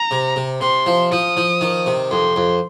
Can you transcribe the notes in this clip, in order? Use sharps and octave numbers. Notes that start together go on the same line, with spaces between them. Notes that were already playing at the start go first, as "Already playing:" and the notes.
Already playing: A#5
C3
C3
C3 C6
F3
F3 D#6
F3
D#3
C3
F2 C6
F2